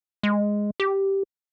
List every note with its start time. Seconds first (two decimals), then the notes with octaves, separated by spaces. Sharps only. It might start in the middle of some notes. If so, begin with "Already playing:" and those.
0.23 G#3
0.80 G4